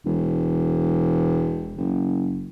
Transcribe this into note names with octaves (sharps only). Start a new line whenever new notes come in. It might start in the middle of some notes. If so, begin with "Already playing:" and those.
E1
F#1